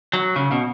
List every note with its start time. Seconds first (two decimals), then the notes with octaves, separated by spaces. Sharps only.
0.13 F#3
0.36 C#3
0.52 B2